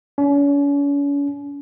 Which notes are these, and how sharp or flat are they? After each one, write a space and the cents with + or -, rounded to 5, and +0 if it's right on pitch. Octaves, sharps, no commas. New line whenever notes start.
C#4 +40